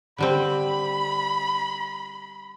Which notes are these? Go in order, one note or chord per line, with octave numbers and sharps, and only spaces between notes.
D3 G3 C4 B5